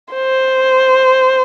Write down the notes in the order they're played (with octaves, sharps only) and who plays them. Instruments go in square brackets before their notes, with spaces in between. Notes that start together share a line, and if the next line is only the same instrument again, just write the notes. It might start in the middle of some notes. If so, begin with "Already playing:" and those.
[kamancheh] C5